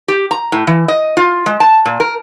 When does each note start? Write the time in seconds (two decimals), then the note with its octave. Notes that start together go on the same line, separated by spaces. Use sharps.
0.08 G4
0.31 A#5
0.52 A2
0.67 E3
0.88 D#5
1.17 F4
1.46 G#3
1.60 A5
1.85 A#2
2.00 A#4